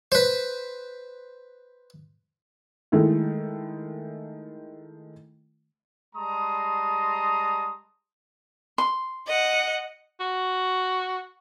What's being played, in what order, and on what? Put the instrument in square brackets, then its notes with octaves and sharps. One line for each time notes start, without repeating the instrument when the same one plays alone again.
[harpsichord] B4 C5
[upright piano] D#3 G#3 A3 E4
[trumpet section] G3 G#3 A5 A#5 C6 D#6
[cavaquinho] C6
[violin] D#5 F#5
[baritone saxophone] F#4